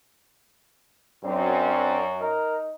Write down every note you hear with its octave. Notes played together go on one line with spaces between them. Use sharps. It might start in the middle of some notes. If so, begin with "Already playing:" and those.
F#2 C4 D4
D#4 A#4